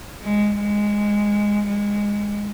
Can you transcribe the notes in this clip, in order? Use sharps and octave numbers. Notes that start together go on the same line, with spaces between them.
G#3
G#3
G#3